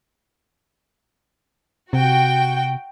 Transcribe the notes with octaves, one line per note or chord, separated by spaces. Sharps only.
C3 F#4 G5